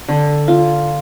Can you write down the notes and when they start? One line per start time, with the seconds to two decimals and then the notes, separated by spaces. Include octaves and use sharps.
0.09 D3
0.48 F4